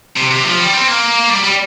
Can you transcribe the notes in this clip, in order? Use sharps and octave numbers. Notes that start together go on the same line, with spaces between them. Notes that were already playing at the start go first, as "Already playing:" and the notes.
C3
C3
F3
G3
C4
A#3
G3
G3